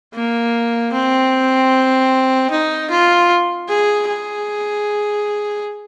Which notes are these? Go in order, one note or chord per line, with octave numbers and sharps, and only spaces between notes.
A#3
C4
D#4
F4
G#4
G#4